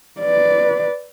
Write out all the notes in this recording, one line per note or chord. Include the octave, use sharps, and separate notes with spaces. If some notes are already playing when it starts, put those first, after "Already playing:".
B4 D5